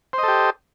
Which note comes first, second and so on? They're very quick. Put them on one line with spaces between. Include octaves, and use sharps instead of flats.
C5 D#5 A4 G4